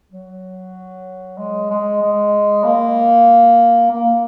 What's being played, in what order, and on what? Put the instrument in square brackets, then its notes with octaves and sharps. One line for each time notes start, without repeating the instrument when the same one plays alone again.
[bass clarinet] F#3
G#3
G#3
G#3
A#3
A#3